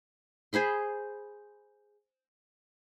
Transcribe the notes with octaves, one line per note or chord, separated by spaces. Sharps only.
G#4 C5 B5 C6